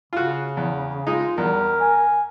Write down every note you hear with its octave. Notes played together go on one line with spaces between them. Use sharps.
C#3 F4 F#4
E2
G#3 D#4 F4
E2 G3 A#4
G#5